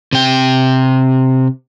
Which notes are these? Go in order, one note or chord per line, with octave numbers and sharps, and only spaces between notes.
C3 G5